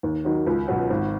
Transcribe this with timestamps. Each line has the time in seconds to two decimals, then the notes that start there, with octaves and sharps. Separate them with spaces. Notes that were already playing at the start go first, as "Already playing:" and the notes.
0.03 D#2
0.25 D#3 F#3
0.46 C#2
0.68 B2 F#3
0.90 G#1